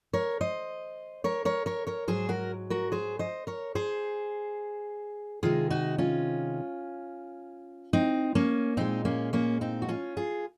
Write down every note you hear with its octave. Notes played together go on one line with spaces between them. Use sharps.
A#4 C#5
C5 D#5
A#4 C#5
A#4 C#5
A#4 C#5
A#4 C#5
G#2 F#3 G#4 C5
F#4 A#4
F#4 A#4
G#4 C5
C5 D#5
A#4 C#5
G#4 C5
C3 D#3 G#3 F4 G#4
D#4 F#4
C#4 F4
C4 D#4
A#3 C#4
A#2 G#3 C4 D#4
A#3 C#4
A#3 C#4
C4 D#4
F#4
C#4 F4
F4 G#4